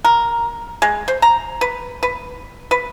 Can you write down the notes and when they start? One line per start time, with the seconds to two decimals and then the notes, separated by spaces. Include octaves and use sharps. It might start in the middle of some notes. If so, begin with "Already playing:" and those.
0.05 A#4
0.82 G#3
1.08 C5
1.22 A#5
1.61 B4
2.03 B4
2.71 B4